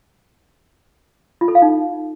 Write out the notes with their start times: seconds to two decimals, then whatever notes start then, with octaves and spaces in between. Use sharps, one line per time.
1.41 F4
1.48 A4
1.55 F5
1.62 D#4